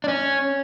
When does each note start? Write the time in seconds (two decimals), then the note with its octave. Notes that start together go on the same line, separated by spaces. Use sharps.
0.04 D4
0.08 C#4